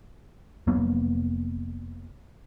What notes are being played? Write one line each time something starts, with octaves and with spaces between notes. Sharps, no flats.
F1 F#3 A#3 B3